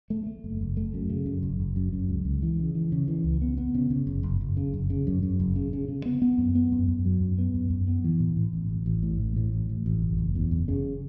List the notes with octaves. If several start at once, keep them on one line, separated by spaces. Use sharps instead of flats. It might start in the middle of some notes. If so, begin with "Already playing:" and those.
A3
A3
F#1
F#1
A3
F#2
C#3
F#2
F#1
F#1
F#2
F#2
C#2
C#2
E3
C#3
E3
C#3
E3
C#2
B3
B3
C#3
C#3
F#1
F#1
F#1
C#3
F#1
C#3
F#2
F#2
F#1
C#3
C#3
C#3
B3
B3
F#2
B3
F#2
F#2
F#3
F#2
B3
F#2
F#2
B3
E3
A2
A2
A1
A1
A1
A2
A1
A2
A1
A1
A1
F#1
F#1
E2
F#1
C#3